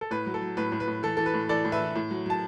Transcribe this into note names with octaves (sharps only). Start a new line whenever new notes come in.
A4
A2 B4
F#3
A4
F#3
A2 B4
A2
B4
A2
E3 A4
E3 A4
B4
A2
E3 A4 D5
A2
B4 E5
E3
A2
F#3
F#3 A5